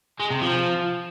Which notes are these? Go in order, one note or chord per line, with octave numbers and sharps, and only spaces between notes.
G#3
C3
F3